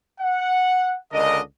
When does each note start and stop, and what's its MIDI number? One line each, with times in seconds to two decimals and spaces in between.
0.21 0.97 78
1.13 1.40 37
1.13 1.40 50
1.13 1.40 62
1.13 1.40 70
1.13 1.40 75